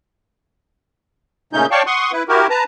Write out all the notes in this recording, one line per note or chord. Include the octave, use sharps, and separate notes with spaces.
A#2 C#3 A3 C#4 D#4 G6
C#5 D5 F5 G5 A5 C#6
F#5 C6 C#6 D#6
E4 B4
E4 F#4 G4 A#4
B4 A5 A#5